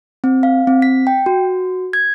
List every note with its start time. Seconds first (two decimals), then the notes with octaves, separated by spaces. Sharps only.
0.24 C4
0.43 F5
0.67 C4
0.82 B6
1.07 G5
1.26 F#4
1.93 G#6